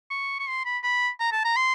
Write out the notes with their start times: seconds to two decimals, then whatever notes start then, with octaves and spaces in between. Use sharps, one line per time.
0.11 C#6
0.39 C#6
0.48 C6
0.66 B5
0.83 B5
1.20 A#5
1.32 A5
1.45 A#5
1.57 C6